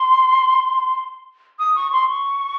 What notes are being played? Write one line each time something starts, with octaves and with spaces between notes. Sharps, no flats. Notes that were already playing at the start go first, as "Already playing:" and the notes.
Already playing: C6
D#6
C#6
C6
C#6